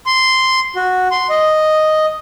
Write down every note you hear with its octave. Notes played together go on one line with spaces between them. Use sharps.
C6
F#4
C6
D#5